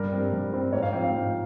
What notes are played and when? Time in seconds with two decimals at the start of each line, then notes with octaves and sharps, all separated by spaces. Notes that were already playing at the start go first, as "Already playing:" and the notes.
Already playing: G2 A#4
0.12 G3 C4
0.33 G2
0.53 G3 C4
0.72 G#2 C#5
0.83 F5
0.93 F3 C4 G5
1.04 F5
1.13 G#2